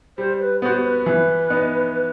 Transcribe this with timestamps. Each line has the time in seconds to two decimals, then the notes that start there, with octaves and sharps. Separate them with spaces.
0.18 G3 C5
0.40 B4
0.62 B3 F#4 C5
0.84 B4
1.06 E3
1.50 B3 D#4